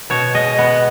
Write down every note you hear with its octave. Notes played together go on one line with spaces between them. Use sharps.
B2 C#5
G#3 D#5
B3 F#5